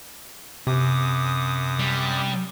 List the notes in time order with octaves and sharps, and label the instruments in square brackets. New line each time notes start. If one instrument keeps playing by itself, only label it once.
[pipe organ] F#2 D6 D#6 [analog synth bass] C3
[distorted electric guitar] G3